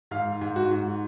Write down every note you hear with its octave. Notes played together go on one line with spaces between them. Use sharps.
G#2 F5
G#2
F#4
G#2